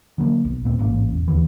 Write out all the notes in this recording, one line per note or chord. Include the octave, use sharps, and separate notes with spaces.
D3 F#3 A3 A#3
B1
D#1 A#2 C4
A1 G#2 A#3 C#4
E1
D#2 D3 E3